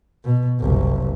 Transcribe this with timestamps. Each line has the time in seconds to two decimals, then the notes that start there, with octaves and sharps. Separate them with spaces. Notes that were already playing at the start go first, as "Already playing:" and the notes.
0.25 B2
0.60 F#1 C2